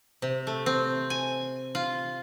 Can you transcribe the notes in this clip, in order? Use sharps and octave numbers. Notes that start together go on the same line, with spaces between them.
C3
A3
C4
G#5
F4